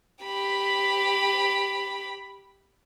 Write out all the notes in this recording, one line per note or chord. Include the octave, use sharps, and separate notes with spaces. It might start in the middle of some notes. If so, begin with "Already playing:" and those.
G4 B5